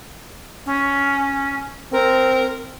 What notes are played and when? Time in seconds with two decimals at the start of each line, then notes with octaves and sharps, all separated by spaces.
0.66 C#4
1.92 C4 A#4